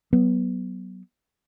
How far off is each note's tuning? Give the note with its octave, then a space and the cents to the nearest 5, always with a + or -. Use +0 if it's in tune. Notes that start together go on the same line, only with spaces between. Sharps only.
F#3 +20 B3 -10